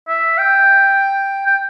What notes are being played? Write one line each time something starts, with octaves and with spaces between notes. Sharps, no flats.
E5
G5
G5